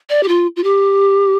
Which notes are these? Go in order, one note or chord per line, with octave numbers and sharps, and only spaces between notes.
D5
G4
F4
F4
G4